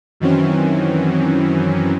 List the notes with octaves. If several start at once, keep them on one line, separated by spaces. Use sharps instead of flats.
F#2 D#3 E3 F#3 C4 C#4